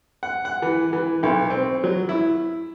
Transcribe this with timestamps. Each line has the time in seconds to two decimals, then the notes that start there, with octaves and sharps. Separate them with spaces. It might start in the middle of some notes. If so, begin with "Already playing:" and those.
0.23 F#5
0.45 F#5
0.62 E3
0.93 E3
1.23 B1
1.50 C4
1.84 F#3
2.09 E4